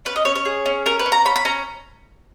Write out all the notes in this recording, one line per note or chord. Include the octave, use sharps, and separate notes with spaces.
C#4 B4
D#5
C#4 C#5
C#5
G#4
C#4
C#4 A#4
B4
C#4
A#5
C#4 B5
B5
C#4 A#5